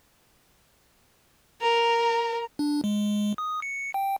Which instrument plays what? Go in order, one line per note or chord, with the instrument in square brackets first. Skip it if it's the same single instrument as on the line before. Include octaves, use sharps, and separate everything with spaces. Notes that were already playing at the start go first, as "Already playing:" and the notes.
[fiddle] A#4 [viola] A#5
[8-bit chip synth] D4
G#3
D#6
C#7
G5